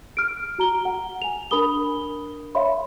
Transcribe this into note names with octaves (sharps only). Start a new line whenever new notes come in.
F6 D7
F#4 A#5 G7
F#5
G#5 F7
D4 A#4 B5 D#6 G7
C#5 E5 F5 B5 C6